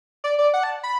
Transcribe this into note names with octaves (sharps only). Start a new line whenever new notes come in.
D5
D5
F#5
A5
B5